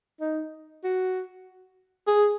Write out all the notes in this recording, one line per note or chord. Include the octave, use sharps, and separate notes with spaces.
D#4
F#4
G#4